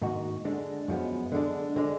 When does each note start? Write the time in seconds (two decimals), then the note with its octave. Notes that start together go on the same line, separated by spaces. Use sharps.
0.02 G#2 D#3 A#3 D#4 F#4
0.45 D3 G#3 D4
0.88 F#2 F3 G#3 B3
1.32 D3 G#3 D4
1.76 D3 G#3 D4